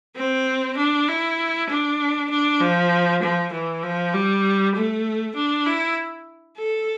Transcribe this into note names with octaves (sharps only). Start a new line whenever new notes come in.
C4
D4
E4
D4
D4
F3
F3
E3
F3
G3
A3
D4
E4
A4